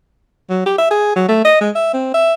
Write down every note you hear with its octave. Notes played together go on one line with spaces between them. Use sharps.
F#3
G4
E5
G#4
F#3
A3
D#5
G#3
E5
C4
E5